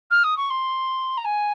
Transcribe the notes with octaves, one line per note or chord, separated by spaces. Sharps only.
F6
D#6
C#6
C6
A#5
G#5